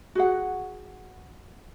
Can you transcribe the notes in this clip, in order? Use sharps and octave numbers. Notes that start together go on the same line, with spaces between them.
F#4 G#4 F#5